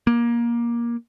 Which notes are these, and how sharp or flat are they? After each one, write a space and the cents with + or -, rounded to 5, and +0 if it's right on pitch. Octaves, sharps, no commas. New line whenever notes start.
A#3 +20